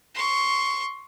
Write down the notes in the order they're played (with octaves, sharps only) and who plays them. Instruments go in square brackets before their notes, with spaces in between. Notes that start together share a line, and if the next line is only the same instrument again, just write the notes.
[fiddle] C6 C#6